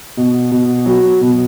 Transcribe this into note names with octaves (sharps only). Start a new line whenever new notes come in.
B2
B2
F#3
B2